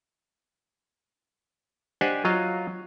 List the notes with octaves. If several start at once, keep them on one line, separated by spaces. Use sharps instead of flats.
D4 G4 C5 D#5 F#5 G#5
F#3 F4 D#5 F5